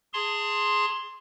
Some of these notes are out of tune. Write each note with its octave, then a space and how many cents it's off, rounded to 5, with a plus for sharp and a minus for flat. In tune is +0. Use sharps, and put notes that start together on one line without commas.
G#4 +0 A5 +25 C6 +10